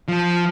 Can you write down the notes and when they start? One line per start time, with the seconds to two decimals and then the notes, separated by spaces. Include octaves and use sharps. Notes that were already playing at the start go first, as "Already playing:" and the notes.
0.08 F3